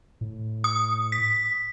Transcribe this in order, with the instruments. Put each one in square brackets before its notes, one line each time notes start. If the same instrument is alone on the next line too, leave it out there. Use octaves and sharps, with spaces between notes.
[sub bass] A2
[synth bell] D#6
B6